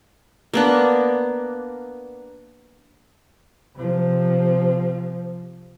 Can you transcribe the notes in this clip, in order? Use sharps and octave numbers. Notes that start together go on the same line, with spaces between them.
A#3 B3 D4
C3 F3